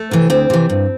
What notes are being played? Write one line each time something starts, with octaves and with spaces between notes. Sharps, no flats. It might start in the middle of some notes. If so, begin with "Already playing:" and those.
Already playing: A3
C3 E3
D2 C4
C3 E3
G2